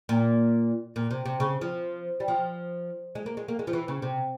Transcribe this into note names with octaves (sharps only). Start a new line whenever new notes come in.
A#2
A#2
C3
C3
C#3
F3
G3
F3
G#3
A#3
G#3
A#3
G#3
F3
E3
C#3
C3